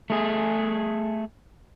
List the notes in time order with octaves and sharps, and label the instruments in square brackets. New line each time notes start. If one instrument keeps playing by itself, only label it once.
[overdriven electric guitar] A3 G#4